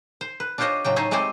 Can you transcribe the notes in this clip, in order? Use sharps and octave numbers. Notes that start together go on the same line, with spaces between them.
C5
B4
D4 F4 G4 C5 C#5 D#5
A2 C#3 F#3 G5
A3 D#4 C5 C#5 E5 G#5
G#3 A3 C4 G4 C5 G#5